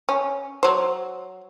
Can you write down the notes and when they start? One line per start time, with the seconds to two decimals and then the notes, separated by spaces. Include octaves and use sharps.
0.09 C#4
0.63 F#3 C5